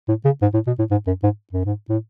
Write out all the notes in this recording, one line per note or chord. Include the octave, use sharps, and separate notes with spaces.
A2
C#3
G#2
A2
B2
A2
G#2
F#2
G#2
F#2
G#2
A2